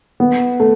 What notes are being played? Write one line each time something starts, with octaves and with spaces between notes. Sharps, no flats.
B3
A3